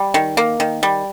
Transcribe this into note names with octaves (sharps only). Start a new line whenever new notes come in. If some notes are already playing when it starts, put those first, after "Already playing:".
Already playing: G3
D#3
A#3
D#3
G3